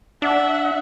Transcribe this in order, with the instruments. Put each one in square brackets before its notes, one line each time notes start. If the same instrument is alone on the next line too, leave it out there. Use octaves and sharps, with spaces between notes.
[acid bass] D4 [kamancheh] E5 F#5